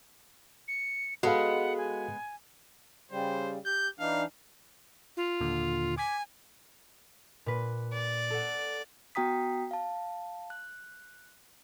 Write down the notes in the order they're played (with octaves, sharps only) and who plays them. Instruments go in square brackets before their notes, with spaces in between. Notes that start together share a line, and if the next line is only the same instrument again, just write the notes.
[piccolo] C#7
[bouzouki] G#3 B3 [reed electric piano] F#4 A4 F5 [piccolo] F#5
[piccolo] G#5
[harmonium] C#3 G3 [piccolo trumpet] C5
[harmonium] G4 [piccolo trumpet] G6
[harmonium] E3 D4 D#4 [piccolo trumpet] F5
[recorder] F4
[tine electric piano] D#2 A#2 D3
[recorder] G#5 [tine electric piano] D6 G#6 B6
[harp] A#2 B4
[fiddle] D5
[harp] A4 F#5
[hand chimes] B3 F#4 G5 A#5 D#6 B6
F5 A5
F#6